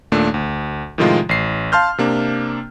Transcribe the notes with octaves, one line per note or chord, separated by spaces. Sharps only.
D#2 A#2 A3 D4
D2
A2 C3 D#3 F3 G#3 F4
A1 C7
F5 A5 C6 F6 G6
C3 A#3 D4